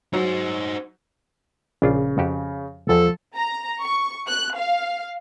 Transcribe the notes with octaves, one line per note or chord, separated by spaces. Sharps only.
F#3 D#4 C5
A#1 C#3 D4 F4
F2 F#4 G4
E2 F3 A4
A#5
C#6
F#6
F5